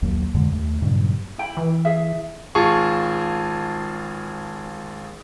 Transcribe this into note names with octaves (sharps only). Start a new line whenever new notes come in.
A#1 D#2 F#3 A#3
F2 G#2 D3 G#3
D#2 A3
G2 A#2 C#3 F#3
E4 G5 B5
E3
G#4 E5
G#1 F4 G#4 A5 C#6